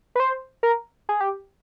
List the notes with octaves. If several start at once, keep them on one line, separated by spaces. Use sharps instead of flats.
B4
C5
A#4
G#4
G4